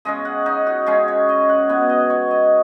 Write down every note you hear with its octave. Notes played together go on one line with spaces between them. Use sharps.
C#3 G#3 C#4 D#5
F#5
D#4
F#4
C#3 G#3 C#4 G#4
C#5
D#5
F#5
B2 B3 F#5
D#5
C#5
D#5